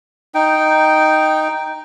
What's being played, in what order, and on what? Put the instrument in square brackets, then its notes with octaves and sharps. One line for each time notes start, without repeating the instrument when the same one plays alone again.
[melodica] D#4 G5